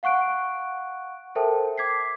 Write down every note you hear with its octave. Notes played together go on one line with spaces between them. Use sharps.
F5 F#5 C#6 F#6 D7
A4 A#4 C5 E5 G5 A5
D6 G#6 B6 C7